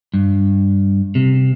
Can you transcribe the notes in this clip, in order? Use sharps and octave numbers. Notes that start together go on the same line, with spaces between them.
G2
C3